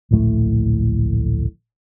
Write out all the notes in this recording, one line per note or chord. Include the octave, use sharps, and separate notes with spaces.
D1 A#1 A2 A3